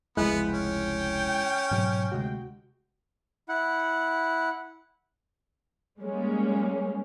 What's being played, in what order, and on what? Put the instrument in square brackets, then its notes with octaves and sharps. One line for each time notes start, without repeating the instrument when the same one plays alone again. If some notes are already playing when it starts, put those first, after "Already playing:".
[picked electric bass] F1 C#2 F3 [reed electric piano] G#3 E4 F#6 [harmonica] B3
[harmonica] C#4 [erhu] G5
[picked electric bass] G#2 B2 F#3
[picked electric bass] D2 C3 G#3 [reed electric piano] F#4
[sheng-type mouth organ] E4 F#5
[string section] G3 G#3 A#3 C#4